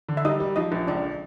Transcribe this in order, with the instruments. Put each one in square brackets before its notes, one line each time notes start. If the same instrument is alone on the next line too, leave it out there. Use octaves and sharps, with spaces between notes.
[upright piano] D3
[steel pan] E5
[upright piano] G3 [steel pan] D#4 D#5
[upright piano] G3
[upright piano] F3 [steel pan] D#4 D#5
[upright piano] A#1
[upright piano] C#2 [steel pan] D4 D5